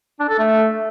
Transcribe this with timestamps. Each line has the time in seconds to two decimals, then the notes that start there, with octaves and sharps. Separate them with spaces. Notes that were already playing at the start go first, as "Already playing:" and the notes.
0.20 D4
0.29 A4
0.39 A3